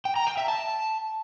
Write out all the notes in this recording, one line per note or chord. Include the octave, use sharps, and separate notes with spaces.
G5
A#5
G5
E5
A5